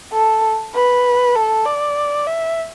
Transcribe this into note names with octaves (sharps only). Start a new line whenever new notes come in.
A4
B4
A4
D5
E5